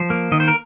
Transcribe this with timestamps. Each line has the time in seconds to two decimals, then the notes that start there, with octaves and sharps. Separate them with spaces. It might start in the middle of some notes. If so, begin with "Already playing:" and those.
Already playing: F3 C5
0.10 A#3
0.32 D#3 D#5
0.40 C5
0.48 A#4